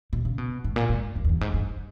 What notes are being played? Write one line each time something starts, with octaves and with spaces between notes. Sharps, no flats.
B2
C#3
B2
G#2
A#2
G#2
G2
E2
G2
G#2
G2